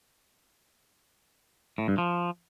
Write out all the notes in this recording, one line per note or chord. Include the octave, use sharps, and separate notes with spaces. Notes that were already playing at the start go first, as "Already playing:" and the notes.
A2
G2
F3